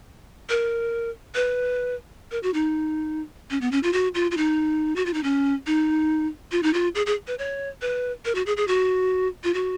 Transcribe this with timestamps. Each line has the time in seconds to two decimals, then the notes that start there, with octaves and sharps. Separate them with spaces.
0.49 A#4
1.35 B4
2.31 A#4
2.43 F#4
2.54 D#4
3.51 C#4
3.61 B3
3.72 C#4
3.83 F4
3.93 F#4
4.15 F4
4.31 F4
4.37 D#4
4.96 F#4
5.06 F4
5.14 D#4
5.23 C#4
5.67 D#4
6.52 F4
6.63 D#4
6.74 F4
6.95 G#4
7.06 G#4
7.27 B4
7.39 C#5
7.82 B4
8.25 A#4
8.35 F#4
8.46 G#4
8.57 G#4
8.68 F#4
9.44 F4
9.54 F#4